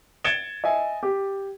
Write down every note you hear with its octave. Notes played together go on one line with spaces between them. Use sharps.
G#6 A6 C#7 D7 E7 G7
D#5 E5 G#5
G4